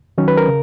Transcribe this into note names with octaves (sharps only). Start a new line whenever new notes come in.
D#3 F#3 C#4
B4
A#4
C#3